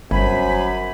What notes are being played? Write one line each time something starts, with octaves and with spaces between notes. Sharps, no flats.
G1 F#2 C5 G#5 B5